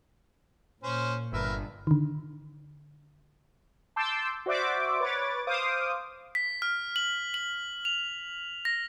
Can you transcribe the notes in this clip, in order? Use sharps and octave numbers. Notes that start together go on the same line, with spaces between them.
A#2 C#4 C5
G1 A#4 B4 E5
D3 D#3
A5 C6 D6 E6 G6
F#4 C5 D5 E5 D6
B4 C#5 D6 A6
C5 F5 D6 D#6
B6
F6
F#7
F#7
F7
A#6